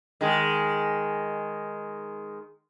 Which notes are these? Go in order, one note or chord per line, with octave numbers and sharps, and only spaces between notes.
D#3 G#3